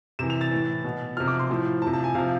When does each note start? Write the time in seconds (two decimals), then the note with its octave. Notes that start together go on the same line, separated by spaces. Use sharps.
0.19 C3 E3 E7
0.30 F7
0.41 A6
0.51 A2 E3
0.84 B2
1.17 C3 F3 F6
1.28 D6
1.39 C6
1.50 A2 F3
1.82 C3 F3 A5
1.93 A5
2.04 G#5
2.15 C3 F3 F5